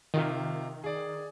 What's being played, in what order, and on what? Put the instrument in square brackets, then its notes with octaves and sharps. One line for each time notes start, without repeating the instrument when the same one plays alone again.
[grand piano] C3 F4 [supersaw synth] D#3
[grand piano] G#4 D5